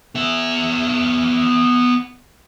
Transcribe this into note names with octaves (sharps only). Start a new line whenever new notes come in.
B3 E5